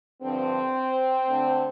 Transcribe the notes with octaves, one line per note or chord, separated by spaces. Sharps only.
G2 D3 F3 C4
D2 D3 A3